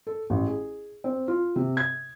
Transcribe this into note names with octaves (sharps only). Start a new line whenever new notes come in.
A4
A1
G#4
C4
F4
C3
G#6